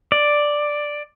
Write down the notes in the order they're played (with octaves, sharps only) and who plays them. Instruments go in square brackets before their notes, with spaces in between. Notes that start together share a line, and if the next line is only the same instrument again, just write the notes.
[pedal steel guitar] D5